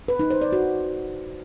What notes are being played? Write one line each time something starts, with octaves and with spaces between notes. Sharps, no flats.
B4
D#4
C5
D5
F#4